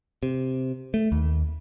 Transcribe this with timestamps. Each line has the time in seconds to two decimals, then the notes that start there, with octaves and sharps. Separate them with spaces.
0.23 C3
0.94 A3
1.12 D#2